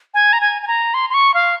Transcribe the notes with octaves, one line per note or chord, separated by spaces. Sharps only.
G#5
A#5
G#5
G#5
A#5
C6
C6
C#6
F5